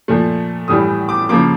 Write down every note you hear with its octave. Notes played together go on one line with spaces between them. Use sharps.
A#2 F3 A3
A2 E3 G3 D#6
D6
C#3 F3 A#3 D6